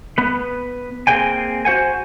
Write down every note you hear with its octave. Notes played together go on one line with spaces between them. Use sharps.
B3 B4
A#3 C4 G#4 C5 G5 G#5
F#4 C5 F#5 G#5